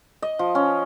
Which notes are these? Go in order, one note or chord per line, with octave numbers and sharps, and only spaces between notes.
D#5
F3
C#4